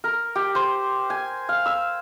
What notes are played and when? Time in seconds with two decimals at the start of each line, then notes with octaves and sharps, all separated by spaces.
0.04 A#4
0.35 G4
0.55 C5
1.10 G#5
1.49 F5
1.66 E6